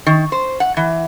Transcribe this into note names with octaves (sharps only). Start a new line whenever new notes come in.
D#3
C5
F#5
E3